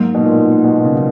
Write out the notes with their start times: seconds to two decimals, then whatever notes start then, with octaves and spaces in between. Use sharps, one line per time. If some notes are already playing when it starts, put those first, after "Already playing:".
Already playing: G#2 F#3 A#3 D#4
0.15 B2
0.25 A#2
0.64 B2
0.84 C#3